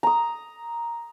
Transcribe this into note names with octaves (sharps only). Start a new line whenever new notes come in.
A#5 D#6